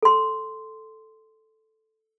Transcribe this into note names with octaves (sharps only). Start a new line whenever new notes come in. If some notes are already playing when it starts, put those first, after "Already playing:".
A4 C6